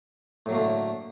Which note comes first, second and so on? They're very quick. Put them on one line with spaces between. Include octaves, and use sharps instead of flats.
A2 F#3 A#3 A3 D3